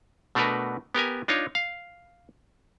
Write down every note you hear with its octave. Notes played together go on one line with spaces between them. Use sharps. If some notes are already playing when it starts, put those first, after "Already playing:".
B2 A3 D4 F#4 A#4 B4
B3 G4 A#4 G#5
D4 D#4 F4 C#5
F5